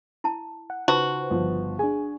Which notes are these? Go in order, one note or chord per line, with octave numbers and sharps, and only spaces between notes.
E4 A5
F#5
C#3 D#4 F4 F#4 B4 C5 A5
G1 F3
D4 G#4 G#5